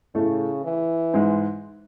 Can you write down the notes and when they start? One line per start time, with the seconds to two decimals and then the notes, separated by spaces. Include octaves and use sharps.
0.15 A2 C#3 A3
0.64 E3
1.14 G#2 G#3